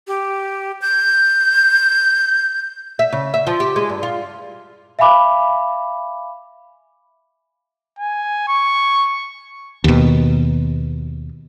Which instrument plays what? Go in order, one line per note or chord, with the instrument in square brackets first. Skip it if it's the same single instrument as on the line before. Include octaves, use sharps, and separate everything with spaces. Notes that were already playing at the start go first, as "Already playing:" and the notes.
[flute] G4
G6
[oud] E5
C#3
E5
F3
G4
G#3
G2
F4
[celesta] E5 F5 G#5 B5 D6
[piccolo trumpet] G#5
C#6
[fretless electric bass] D#2 B2